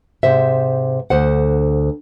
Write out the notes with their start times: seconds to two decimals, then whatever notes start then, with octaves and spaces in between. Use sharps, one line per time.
0.23 G#2 C3 C5 E5
1.10 D2 C5 F#5